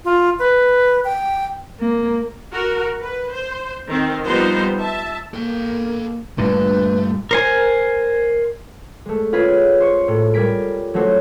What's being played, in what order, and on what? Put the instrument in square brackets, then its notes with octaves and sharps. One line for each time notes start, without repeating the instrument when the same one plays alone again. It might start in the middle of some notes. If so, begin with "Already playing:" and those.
[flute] F4
B4
G5
[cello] A#3
[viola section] F#4 A#4
B4
C5
D#3 C4
F3 G3 B3 D#4 C5
E5 A5
[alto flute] A#3 [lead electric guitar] A4 G5
[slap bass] G2 A#2 D3 [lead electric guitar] A3 [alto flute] B4
[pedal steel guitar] A#4 C5 G#5
[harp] G#3 A3
C#4 F4 G#4 B4 B5
C5 C#6
A2
G3 A#4 G#5 B6 D7
F#3 A3 C#4 F#4 C5